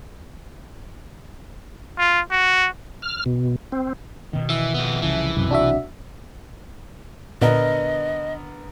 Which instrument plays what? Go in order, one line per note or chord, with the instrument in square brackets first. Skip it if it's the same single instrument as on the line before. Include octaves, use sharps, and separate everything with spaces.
[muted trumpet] F4
F#4
[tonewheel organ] F6
B2
C4
[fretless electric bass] B2 D#3
[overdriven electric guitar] E3 [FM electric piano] E5
[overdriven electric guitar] F2 B3
[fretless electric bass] C2 C#3 F3 [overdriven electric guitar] E3
[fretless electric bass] B1 C3 [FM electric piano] F#2
[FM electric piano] D4 F#4 E5
[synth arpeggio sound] A#2 [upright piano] D3 B3 A#4 [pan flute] D#5